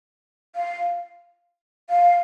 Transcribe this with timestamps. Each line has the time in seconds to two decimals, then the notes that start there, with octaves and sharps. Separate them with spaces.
0.55 F5
1.90 F5